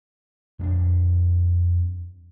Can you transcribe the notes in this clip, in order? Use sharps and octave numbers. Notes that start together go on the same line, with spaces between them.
F2 C#4 D4